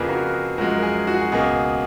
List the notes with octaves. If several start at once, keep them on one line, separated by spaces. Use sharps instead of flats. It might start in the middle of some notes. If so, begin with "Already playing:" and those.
Already playing: F2 C#3 F3 A#3 G#4 B4
F#4 A#4
G#4
F#2 F3 G#3 F#4 A#4
A#4
G#4
F#4
G#4
F#4
C#2 B2 A#3 G#4